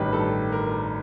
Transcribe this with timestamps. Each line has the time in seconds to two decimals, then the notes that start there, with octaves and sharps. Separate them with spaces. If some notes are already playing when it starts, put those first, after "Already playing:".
Already playing: A1 G2 D#3 B4
0.13 A4
0.52 A#4